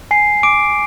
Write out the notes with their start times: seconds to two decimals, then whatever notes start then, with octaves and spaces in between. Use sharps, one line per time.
0.11 G#5 C7
0.43 D6 D7